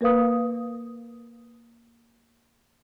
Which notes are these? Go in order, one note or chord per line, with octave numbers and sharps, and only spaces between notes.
A#3 A#4 B4 F5 D#6